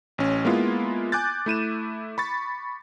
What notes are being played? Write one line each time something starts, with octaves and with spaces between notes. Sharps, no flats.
A1 C#4
G#3 A#3 B3 E4 F4
G#5 D6 F#6 G6 A6
A3 E4 D#7 E7
B5 C#6 A6